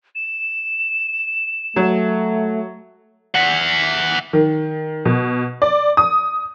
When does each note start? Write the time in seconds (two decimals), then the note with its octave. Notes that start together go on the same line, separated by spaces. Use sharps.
0.15 E7
1.76 F#3 A3
3.35 E5 F#5
4.33 D#3
5.05 B2
5.62 D5
5.97 D#6